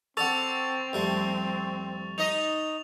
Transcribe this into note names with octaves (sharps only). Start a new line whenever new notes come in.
C4 A4 D5 F#5 C#6 A6 F7
F2 G3 A3
D#4 D#5 F7